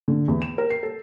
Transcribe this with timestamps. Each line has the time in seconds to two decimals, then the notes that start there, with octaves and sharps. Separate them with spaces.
0.08 D3
0.28 E2
0.42 E7
0.58 A#4
0.70 C7
0.83 A4